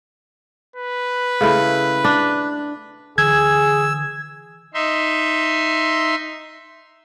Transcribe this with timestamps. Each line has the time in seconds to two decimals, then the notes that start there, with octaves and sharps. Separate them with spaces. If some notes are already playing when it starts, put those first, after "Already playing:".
0.76 B4
1.41 C#3 A3 E4
2.04 D4
3.18 D3 E3 G#4 E6 G#6
4.74 D#4 E5 C6